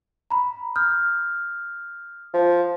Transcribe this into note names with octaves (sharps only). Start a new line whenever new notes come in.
A#5 B5
D#6 F6 G6
F3